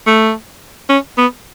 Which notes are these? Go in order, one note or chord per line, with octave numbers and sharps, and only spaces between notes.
A3
C#4
B3